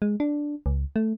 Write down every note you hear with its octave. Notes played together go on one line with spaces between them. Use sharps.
G#3
D4
C#2
A3